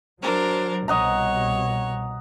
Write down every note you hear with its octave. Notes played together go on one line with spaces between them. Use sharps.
F#3 D4 A#4 C5
C2 B2 C#5 D#5 F#5 A#5